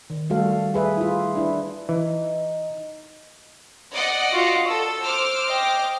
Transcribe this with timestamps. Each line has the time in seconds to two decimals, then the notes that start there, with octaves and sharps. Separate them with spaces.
0.10 D#3
0.30 G3 A3 F#4 A4 F5
0.74 G#4 B4 E5
0.97 E4 F4
1.36 D4 E4 B4
1.89 E3 D#4
3.94 D5 D#5 F#5
4.32 F4 F#4
4.68 A4 E6
5.05 C5 D6 F6
5.48 D#5 G5